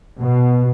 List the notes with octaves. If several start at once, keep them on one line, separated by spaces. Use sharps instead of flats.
B2